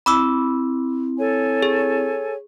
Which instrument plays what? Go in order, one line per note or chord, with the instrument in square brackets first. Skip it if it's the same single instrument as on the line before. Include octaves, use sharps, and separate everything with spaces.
[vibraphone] C4 E4 [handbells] B5 D6 E6
[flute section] A4 C#5 G#5
[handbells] G#4